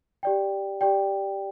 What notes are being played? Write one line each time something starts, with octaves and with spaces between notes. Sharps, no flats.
G4 D5 G5
G4 D5 G5